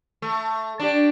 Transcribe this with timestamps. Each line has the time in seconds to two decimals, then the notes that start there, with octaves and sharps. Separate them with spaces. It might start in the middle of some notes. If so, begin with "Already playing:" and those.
0.22 A3
0.80 D4 G4